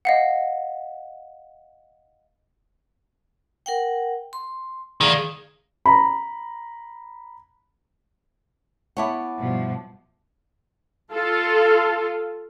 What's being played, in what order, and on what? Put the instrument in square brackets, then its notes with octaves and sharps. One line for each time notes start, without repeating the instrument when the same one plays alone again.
[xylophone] D#5 F5 F#5
[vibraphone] A#4 F#5 G5
C6
[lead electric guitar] D2 D#3 [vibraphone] G#4 D5 F5
[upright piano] A#5 B5
[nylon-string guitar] B3 E4 C#5 [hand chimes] F#5 A5 D6
[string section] G2 B2 F3
[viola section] F4 A4